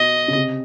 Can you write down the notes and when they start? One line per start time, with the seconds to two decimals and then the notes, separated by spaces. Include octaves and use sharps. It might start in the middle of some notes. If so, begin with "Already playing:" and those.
Already playing: B2 D#5
0.28 C#3
0.35 C3